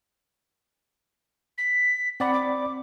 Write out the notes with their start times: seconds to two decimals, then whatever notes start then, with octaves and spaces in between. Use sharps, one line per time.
1.58 B6
2.20 C4 D5 F#5 B5
2.34 D6